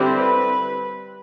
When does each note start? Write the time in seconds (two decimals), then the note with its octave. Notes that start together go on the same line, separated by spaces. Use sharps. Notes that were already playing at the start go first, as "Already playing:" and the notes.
Already playing: D3 G3 C4 E4
0.16 B4